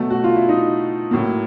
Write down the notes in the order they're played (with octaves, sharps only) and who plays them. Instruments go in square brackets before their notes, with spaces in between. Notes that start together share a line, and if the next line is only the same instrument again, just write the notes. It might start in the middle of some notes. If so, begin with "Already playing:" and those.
Already playing: [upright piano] B2 F#3 A3
F#4
F4
E4
D#4
A2 F#3 A#3